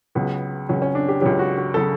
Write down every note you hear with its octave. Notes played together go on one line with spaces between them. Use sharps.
C#2 C#3 F#3 B3
C#2 C#3 F#3 C#4
C#4
D4
G4
C#2 C#3 F#3 G4
F#4
F#4
C#3 F#3 A4